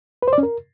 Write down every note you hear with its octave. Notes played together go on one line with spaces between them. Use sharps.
B4
C5
D5
C#4
A#4